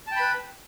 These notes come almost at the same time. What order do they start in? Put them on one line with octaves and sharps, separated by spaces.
A5 G5 B5 B4